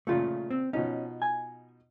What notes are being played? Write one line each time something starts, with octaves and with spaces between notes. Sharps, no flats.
A#2 C#3 F3 A3 F4
C4
B2 F3 C#4 D#4
G#5